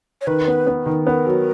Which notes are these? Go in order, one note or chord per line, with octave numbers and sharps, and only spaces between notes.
C#5
D#3 B4
B3
B3
D#3
B3 A#4
F#3